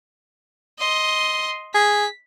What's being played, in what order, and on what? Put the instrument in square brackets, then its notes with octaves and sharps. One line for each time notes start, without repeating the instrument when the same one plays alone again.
[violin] D#5 C6
[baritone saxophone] G#4 [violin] B6